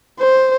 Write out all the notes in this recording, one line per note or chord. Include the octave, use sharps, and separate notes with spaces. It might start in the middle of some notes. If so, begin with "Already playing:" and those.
C5